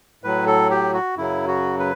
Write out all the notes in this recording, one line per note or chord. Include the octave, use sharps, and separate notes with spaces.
A2 F#3 B4
A4
G4
F#4
F#2 C#3 F#3 E4
F#4
B4